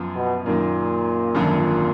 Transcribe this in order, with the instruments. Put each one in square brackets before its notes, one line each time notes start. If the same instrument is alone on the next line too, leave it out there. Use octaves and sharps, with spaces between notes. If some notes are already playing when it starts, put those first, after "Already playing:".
Already playing: [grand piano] F#2 F3 B3
[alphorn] B2
[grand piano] F#2 D#3 A#3 [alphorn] A#2
[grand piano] G#1 F#2 D3 F3